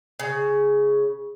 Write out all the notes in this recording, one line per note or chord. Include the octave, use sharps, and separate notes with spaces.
C#3